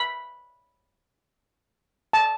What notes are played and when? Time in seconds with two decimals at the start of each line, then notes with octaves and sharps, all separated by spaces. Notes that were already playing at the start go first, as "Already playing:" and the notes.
Already playing: B5
2.13 A5